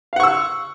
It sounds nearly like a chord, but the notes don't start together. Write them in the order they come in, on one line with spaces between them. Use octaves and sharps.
F5 F#5 C#6 E6